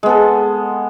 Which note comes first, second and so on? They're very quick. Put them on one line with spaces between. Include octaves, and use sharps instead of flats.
G#3 B3 A4